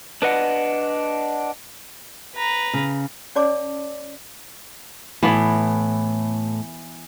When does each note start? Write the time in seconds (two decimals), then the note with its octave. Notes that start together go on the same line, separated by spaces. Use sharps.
0.22 D4 B4 D#5 F#5
2.35 B4 A#5
2.74 C#3
3.35 C#4 C#5 D5 A5 D6
5.23 A2 E3 B3